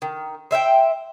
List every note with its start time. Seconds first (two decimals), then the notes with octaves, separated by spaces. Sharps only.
0.02 D#3
0.51 C5 E5 F5 G5